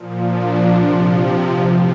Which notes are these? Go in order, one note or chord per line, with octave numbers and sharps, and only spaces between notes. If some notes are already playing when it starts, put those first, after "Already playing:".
Already playing: A#2 F3
D4
C3 F3
A2 F3 C4